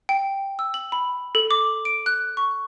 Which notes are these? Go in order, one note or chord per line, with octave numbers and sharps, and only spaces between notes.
G5
E6
F#7
B5
A4
D6
D7
F#6
C#6